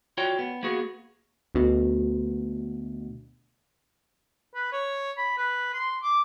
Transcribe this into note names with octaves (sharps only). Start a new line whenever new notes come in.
F4 F#4 C#5 D5 G5
B3
A#3 B3 F#4 G#4
D2 B2
B4
C#5
B5
B4
C6
D6